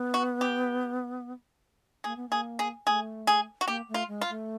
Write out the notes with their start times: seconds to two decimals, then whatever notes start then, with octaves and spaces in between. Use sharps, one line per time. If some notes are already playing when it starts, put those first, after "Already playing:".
Already playing: B3
0.14 F#4
0.41 G4
2.04 A#3 G#4
2.17 B3
2.29 A#3 G#4
2.59 G#4
2.87 A#3 G#4
2.91 A3
3.27 G#4
3.61 F#4
3.67 A#3 G4
3.89 A3
3.94 F4
4.08 G#3
4.21 F4
4.29 A3